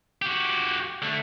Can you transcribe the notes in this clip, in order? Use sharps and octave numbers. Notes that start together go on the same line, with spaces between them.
F#4 G4
D3 A3